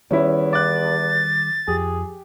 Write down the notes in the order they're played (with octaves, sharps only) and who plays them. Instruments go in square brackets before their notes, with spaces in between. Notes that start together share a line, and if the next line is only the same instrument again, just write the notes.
[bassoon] E2 [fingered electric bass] D#3 G3 [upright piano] C#4 E4
[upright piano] D6 F#6 [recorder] A6
[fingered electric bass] F2 [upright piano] G4 [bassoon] G#4